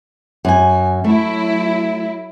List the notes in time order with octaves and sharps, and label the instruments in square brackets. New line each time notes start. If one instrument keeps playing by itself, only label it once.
[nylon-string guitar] F#2 G#5
[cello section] F#3 E4 [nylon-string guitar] A3